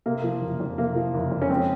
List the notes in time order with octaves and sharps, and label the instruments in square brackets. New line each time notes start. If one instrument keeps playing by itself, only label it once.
[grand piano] C3 [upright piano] A#3
[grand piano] F3
F#1
F2
[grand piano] C3 [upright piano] A#3
[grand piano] F3
F#1
F2
[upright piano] C#4
[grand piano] G#3 [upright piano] C4